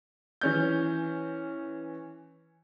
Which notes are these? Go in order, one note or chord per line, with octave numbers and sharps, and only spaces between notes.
E3 C#4 G6